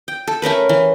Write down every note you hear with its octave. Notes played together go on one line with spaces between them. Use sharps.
G5
A4
A3 C#4 A#4 B4
E3